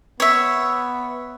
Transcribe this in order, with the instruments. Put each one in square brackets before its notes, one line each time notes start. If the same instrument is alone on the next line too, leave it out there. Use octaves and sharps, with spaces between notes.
[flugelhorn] B3 [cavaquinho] C#5 E5